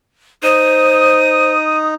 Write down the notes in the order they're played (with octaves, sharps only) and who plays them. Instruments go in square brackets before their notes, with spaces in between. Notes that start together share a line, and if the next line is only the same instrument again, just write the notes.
[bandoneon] D#4 [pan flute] C5 [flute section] D#6 [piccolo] D#7